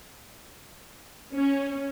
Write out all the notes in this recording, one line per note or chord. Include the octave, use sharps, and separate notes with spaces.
C#4